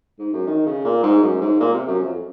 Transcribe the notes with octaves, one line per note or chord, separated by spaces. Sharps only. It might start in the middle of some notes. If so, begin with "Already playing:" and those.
G#2
F#2
D#3
C#3
A#2
G#2
F#2
G#2
A#2
C3
F#2
F2